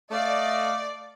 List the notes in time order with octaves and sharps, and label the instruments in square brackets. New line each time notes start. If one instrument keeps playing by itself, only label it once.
[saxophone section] A3 [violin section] D5 [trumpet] D#5 [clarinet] F5